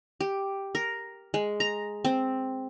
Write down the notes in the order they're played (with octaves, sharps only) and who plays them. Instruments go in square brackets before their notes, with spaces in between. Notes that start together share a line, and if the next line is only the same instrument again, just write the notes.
[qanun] G4
A#4
G#3
A#5
C4